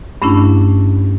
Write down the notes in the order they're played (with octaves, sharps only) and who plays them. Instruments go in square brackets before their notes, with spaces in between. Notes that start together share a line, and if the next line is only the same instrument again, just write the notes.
[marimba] G2 A3 C#4 D4 E4